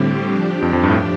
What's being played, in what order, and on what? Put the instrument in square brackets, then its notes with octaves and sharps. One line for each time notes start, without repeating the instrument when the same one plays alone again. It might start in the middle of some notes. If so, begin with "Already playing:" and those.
Already playing: [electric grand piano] A2 [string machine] D3 G3 C4 G4
[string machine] F3 D4 G4
[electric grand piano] F2
F2
G2
A2